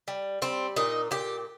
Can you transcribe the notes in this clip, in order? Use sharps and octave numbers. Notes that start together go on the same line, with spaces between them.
G3
G3 C4
A#2 D#4
A#2 G4